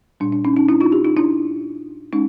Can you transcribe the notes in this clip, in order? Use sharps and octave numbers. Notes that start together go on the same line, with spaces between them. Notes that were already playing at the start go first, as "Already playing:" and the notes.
A#2 G3 D4
D4
C#4 D#4
C#4 D#4
D4 E4
D#4 F4
F4 G4
D#4 F4
D4 E4
G#3 C#4 D#4